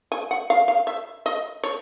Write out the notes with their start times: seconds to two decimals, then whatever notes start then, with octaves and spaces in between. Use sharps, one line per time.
0.12 G#5
0.31 F#5
0.50 F5
0.68 F5
0.87 E5
1.26 D#5
1.63 C#5